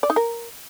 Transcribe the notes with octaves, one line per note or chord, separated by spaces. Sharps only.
D5
D#4
A#4